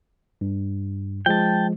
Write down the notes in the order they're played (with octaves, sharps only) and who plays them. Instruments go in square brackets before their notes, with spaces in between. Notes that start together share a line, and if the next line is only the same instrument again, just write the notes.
[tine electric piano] G2
[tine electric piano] F3 G#3 [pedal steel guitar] G5 A5